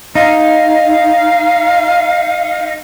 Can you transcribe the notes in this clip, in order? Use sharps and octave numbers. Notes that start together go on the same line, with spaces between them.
D#4 F5